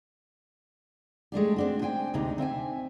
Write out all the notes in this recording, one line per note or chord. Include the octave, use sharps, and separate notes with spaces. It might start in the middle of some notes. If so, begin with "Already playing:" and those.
G#3 A3 D4 G4
C4 D4 F#4
C5 G5 G#5
D2 C3 D4 D#4
C4 E5 G5 G#5